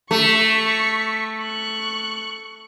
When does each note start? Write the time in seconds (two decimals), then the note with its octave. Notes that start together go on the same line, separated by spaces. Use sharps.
0.11 A3 C#6 B6
1.42 C#6 F#6